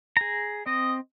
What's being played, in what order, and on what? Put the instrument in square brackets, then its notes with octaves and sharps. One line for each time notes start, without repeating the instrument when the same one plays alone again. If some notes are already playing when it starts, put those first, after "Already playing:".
[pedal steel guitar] G#4 A#5
[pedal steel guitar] C4 [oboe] D#5